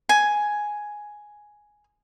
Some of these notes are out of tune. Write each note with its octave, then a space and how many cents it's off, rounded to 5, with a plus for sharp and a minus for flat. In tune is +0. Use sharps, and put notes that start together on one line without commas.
G#5 +5